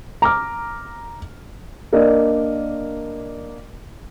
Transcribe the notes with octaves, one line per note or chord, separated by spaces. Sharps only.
A#5 D6 F6
A#3 D4 A#4 D5 D#5